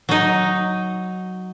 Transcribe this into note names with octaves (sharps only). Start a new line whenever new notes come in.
F#3 D#4